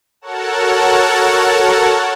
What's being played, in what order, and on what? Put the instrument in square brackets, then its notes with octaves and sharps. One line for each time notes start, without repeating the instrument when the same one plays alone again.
[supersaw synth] F#4 A4 A#4 C#5 F#5 A5